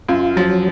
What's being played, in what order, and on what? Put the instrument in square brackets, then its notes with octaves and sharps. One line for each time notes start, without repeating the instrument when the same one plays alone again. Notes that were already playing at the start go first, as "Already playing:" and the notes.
[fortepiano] F#2 [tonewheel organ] F4
[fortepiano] F3 [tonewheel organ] F#3